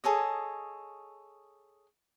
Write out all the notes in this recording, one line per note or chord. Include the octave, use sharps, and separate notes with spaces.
G#4 A4 C#5 D#5